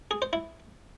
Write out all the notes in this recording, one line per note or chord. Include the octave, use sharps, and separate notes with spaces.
G#4
C5
E4